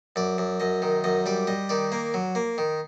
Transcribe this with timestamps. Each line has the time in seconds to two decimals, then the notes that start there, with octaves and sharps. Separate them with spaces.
0.16 F#2 D5
0.38 F#2
0.60 F#2 D#5
0.82 D#3
1.04 F#2 D#5
1.26 G3 D5
1.47 G3 D#5
1.69 D#3 D5
1.92 A#3
2.14 F#3
2.35 A#3
2.58 D#3